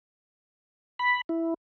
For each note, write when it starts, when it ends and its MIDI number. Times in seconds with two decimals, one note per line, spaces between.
0.99 1.21 83
1.29 1.54 64